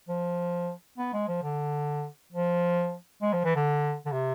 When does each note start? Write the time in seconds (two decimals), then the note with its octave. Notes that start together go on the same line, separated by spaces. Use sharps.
0.08 F3
0.98 B3
1.13 G#3
1.28 F3
1.43 D3
2.33 F3
3.22 G#3
3.33 F3
3.44 E3
3.55 D3
4.06 D3
4.12 C3